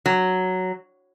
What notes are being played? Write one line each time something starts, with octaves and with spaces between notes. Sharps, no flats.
F#3